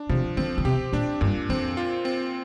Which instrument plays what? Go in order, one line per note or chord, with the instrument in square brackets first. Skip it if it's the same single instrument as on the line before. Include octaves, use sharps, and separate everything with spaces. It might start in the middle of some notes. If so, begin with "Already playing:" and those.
Already playing: [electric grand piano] D4
[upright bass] C3 [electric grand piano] F3
[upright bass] D3 [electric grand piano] C4
[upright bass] D3
[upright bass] C3 [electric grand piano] G4
[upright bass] A#2 [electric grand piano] D4
[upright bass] G2 [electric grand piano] A#2
[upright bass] F2 [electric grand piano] C4
[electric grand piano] F4
C4